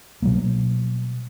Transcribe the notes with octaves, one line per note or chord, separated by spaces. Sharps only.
B2 F#3 G3 A#3